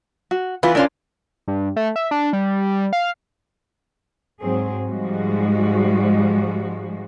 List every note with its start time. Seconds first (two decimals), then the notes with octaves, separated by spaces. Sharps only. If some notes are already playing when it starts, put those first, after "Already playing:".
0.31 F#4
0.63 E3 B3 F4 B4
0.75 B3 C#4 D4 F4 A#4
1.48 G2
1.76 A3
1.96 E5
2.11 D4
2.33 G3
2.93 F5
4.42 G#2 F#3 C4 G#4
4.88 G#2 F3 G3 G#3 F#4